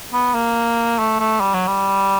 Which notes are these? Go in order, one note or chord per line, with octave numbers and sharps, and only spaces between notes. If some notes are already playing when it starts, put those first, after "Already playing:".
B3
A#3
A3
A3
G3
F#3
G3